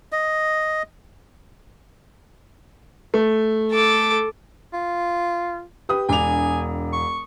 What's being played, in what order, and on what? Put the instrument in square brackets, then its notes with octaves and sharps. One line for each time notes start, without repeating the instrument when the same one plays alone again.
[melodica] D#5
[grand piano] A3
[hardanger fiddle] A4 D6
[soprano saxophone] F4
[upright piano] G4 B4 D#6
[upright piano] E1 D6 F7 [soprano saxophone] G#5
[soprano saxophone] C#6